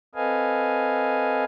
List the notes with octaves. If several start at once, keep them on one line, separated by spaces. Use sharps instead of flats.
C4 A4 B4 D#5 F5 G#5